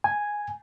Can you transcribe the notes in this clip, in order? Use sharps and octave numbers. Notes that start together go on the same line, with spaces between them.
G#5